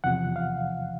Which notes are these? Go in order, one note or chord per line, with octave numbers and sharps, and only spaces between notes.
E2 C3 F3 F#5
F5